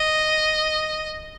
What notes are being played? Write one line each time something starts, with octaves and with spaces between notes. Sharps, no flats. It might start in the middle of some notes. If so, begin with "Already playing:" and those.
Already playing: D#5